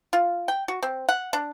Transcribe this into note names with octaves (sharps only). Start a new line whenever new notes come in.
F4
G5
F#4
C4
F#5
D4